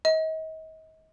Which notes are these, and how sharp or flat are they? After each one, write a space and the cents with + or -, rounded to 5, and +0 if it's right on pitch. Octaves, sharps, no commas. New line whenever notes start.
D#5 +40